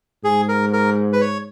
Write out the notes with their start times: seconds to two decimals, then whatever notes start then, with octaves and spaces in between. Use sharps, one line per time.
0.24 G#2 G#4
0.49 A#4
0.73 A#4
1.13 B4
1.21 C#5